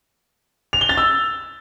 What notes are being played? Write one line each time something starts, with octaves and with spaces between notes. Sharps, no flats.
F7
G7
A6
E6